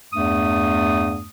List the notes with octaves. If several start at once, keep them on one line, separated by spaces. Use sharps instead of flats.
E2 G2 A3 D#6